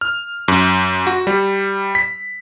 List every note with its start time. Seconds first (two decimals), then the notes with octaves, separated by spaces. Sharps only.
0.01 F6
0.48 F#2
1.07 F#4
1.27 G3
1.95 B6